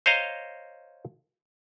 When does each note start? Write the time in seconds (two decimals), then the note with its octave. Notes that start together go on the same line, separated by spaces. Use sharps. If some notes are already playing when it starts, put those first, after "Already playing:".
0.06 C5 C#5 D#5 F5 A#5